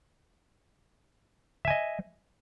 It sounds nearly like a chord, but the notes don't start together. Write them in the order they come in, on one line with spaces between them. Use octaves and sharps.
E5 G#5 D#5